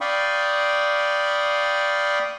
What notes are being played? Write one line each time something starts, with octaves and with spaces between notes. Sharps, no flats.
D5 F5 G5 B5 C#6 D#6